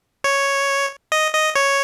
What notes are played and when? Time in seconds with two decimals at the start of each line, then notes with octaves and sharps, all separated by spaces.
0.24 C#5
1.12 D#5
1.33 D#5
1.56 C#5